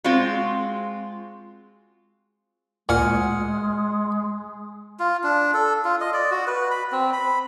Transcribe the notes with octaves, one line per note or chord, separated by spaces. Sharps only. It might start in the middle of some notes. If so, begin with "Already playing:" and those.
G#3 C4 F4 F#4
D2 A#2 G#3 F#5 G#5 F6
F4
D4
A4
F4
D#5
D5
F#4
B4
B5
C4
B5